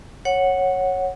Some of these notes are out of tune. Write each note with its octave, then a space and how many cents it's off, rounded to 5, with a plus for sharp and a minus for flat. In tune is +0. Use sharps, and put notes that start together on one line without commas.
C#5 -10 F#5 +0